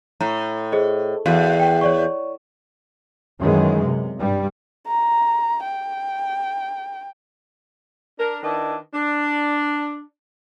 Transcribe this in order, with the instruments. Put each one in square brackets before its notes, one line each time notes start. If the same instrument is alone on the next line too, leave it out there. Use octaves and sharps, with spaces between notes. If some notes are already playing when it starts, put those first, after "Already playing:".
[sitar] A2 [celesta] A#5
[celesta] G#4 C5 D#5
[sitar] E2 [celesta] F#4 F5
[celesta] G5
C#5 D5 C#6
[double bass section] F#2 D#3 E3 G#3
C3
G2 G3
[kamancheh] A#5
G5
[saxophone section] D4 A#4
D#3 D4 E4 B4 D#5
D4